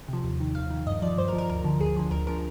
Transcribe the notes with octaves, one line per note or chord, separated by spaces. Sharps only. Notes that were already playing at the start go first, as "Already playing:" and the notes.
C3 F3
D#2
D#3
D#2 F5
D#3
G2 D#5
F3 D5
G2 C5
A#4
F3
A#4
D2 A#4
D3 F3
D2 G#4
D3 F3
D2 A#4
D3 F3 A#4